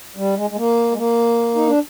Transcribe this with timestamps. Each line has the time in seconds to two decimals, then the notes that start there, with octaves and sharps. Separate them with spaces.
0.16 G3
0.36 G#3
0.50 G#3
0.57 A#3
0.92 G#3
0.98 A#3
1.55 D#4
1.67 D4